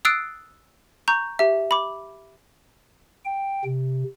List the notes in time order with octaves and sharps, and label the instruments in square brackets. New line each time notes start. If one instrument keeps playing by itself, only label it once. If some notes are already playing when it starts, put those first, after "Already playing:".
[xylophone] D#6 E6 F#6 A6 C7 D7
A#5 C#6 G6
G4 E5
B5 D6
[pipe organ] G5
C3